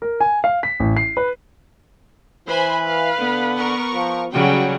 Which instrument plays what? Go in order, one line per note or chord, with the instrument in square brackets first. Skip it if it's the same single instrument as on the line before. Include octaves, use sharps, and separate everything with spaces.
[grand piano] A#4
G#5
F5
B6
A1
C7
B4
[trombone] E3 [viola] B4 [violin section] C5 G#5 B5
[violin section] F5
[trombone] D3 [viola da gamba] B3
[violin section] A#4 C#6
[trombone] F3
[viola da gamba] C#3 F#3 G3 [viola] C#4 [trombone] F#4 [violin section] G5